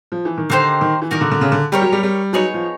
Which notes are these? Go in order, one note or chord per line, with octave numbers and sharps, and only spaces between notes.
F3
E3
D#3
D3 A#3 D#4 G4 C5
D#3
E3
D#3 D#4 F#4 A#4 D5
D3
D3
C#3
D3
G3 G4 A#4 C#5
F#3
G3
G3
F#3 B3 D#4 G#4 C#5
F3